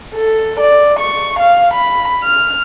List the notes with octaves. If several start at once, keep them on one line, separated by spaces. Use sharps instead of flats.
A4
D5
C#6
F5
B5
F6